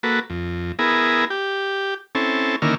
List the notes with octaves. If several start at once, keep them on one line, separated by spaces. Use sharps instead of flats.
A#3 F#4 A4 B4
F2
B3 E4 G#4 A#4
G4
C4 C#4 E4 A4
D3 D#3 A#3 C#4 E4 F6